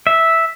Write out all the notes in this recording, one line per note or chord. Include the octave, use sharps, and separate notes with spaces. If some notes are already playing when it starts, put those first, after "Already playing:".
E5